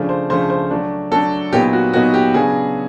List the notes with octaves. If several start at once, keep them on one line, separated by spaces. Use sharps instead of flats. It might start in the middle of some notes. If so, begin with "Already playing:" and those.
Already playing: C#3 F3 A3 D4
C5
C#3 F3 A3 D4 C5
C5
F#3 A3 D4
F#3 A3 D4 A4
A#2 F#3 B3 D#4 G4
F#4
A#2 F#3 B3 D#4 F#4
G4
C#3 F#3 B3 D4 G#4